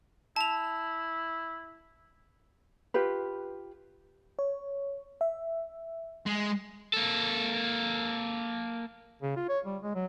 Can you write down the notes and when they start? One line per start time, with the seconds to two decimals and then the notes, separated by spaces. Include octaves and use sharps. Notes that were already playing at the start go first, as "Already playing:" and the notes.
0.36 E4 A5 F7
2.94 F4 G4 B4
4.39 C#5
5.21 E5
6.26 G#3
6.93 A#3 A4
9.22 C#3
9.36 F4
9.49 C#5
9.66 G3
9.83 G#3
9.95 F#3